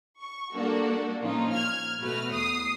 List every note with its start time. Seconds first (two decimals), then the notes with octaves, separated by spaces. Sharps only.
0.20 C#6
0.54 G3 A#3 D4 F#4 A4
1.22 A#2 F3 C#4 D#4 F4
1.54 F6 G#6
1.99 B2 A3 F#4 B4 F6
2.31 E2 D#6 C7